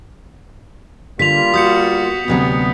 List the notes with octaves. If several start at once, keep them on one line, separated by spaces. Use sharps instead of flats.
D3 G3 A#3 F4 B6 F7
B3 F#4 D#6 G6 C#7
D2 C3 F#3 B3